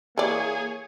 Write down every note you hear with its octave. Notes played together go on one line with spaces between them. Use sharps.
E3 A#3 G#4 C#5 D5